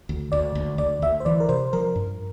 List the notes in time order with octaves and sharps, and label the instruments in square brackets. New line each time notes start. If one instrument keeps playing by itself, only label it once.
[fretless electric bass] D2
[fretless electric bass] D2 [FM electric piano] D5
[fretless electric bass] D2
[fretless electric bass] D2 [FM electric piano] D5
[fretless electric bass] D2 [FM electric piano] E5
[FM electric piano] C5
[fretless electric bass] E3 [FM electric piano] D5
[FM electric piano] A#4
[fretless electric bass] C3 [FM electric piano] C5
[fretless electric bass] F3 [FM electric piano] A#4
[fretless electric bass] G2